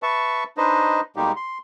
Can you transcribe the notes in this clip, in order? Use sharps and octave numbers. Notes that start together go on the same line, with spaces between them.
B4 E5 A5 C#6
D4 D#4 B4 C5 D#5
B2 G3 G#3 A#3 D#4 G4
C6